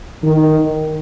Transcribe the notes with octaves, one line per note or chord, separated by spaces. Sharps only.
D#3